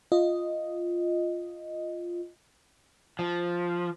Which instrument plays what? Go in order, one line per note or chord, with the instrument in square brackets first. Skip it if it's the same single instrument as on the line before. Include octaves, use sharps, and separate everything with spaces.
[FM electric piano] F4 D#5
[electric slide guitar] F3